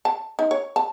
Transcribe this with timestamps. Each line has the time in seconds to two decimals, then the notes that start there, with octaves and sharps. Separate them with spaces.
0.05 A5
0.39 D#4
0.51 C#5
0.76 A5